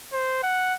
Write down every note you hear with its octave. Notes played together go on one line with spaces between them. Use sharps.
C5
F#5